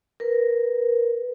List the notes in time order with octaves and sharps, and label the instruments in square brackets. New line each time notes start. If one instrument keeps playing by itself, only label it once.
[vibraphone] A#4 B4